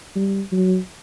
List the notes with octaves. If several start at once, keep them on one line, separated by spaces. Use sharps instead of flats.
G3
F#3